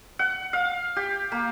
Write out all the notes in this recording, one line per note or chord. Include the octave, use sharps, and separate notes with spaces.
F#5
F5
G4
A#3